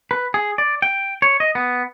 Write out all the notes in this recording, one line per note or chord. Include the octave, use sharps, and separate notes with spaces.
B4
G#4
D5
G5
C#5
D#5
B3